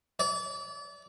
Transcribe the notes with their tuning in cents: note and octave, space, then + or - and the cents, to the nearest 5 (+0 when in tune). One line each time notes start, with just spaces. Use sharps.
D5 -35